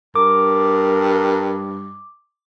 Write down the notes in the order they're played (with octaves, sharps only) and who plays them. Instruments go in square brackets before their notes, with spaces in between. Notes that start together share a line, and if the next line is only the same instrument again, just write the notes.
[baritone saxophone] G2 [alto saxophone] A#4 [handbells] D6